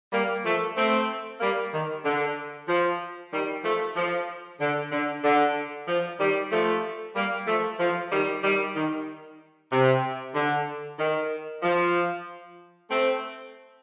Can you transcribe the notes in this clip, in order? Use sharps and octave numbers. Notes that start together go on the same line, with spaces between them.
G3 A#3
F3 A3
A3 C4
G3 A#3
D#3
D3
F3
D#3 G3
F3 A3
F3
D3
D3
D3
F3
D#3 G3
F3 A3
G3 A#3
F3 A3
F3
D#3 G3
D#3 G3
D#3
C3
D3
D#3
F3
A3 C4